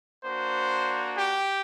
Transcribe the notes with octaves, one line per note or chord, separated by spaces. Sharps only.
A#3 D4 F#4 C5
G4